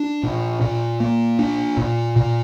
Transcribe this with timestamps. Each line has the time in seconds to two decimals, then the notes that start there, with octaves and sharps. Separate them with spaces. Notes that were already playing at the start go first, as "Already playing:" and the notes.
Already playing: D4
0.23 A#2
0.61 A#2
1.00 A#3
1.39 D4
1.77 A#2
2.16 A#2